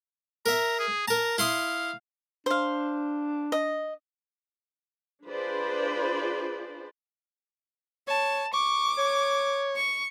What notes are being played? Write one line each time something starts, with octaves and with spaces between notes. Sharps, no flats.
A#4 E5 A#5
G#4
A#4 A5 A#5
E4 F5 C6 D#6
D4 C5 F5
D#5
D4 F4 G#4 B4 C5 D5
C#5 A5
C#6 D6
C#5
C#6